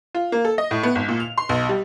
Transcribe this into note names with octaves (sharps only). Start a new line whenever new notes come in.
F4
A#3
A4
D#5
A2
B3
G#1
A#2
F7
C6
B1
G3